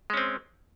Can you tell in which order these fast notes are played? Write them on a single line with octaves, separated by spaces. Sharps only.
G#3 C#4 C4